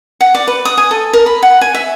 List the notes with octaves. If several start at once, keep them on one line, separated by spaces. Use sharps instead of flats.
F#5
D5
B4
D#6
G#5
A4
A#4
B5
F#5
G#5
E5